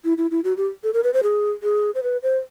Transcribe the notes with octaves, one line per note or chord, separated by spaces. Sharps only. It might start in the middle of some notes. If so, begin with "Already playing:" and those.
E4
E4
E4
F#4
G4
A4
A#4
B4
C5
G#4
G#4
C5
B4
C5